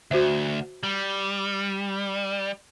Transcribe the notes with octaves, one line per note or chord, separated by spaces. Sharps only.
D2 F#4 C5 E5
G3